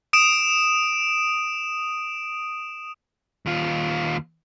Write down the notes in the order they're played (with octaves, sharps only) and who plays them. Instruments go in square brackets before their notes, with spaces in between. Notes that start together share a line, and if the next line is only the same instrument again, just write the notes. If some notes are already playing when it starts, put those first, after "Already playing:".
[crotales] D#6 D7 E7
[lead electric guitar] D#2 F4